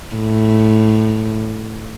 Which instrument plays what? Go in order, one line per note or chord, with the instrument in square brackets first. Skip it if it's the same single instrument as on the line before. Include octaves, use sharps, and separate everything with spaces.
[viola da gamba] A2